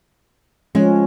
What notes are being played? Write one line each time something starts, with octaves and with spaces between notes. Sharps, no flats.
F3 G#3 C#4